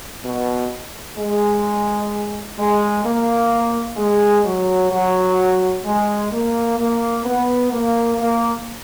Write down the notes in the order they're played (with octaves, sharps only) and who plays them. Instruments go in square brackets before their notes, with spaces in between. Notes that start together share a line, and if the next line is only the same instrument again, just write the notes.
[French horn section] B2
G#3
G#3
A#3
G#3
F#3
F#3
G#3
A#3
A#3
B3
A#3
A#3